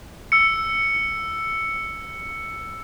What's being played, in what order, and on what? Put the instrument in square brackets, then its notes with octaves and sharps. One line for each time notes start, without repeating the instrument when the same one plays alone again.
[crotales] E6 C#7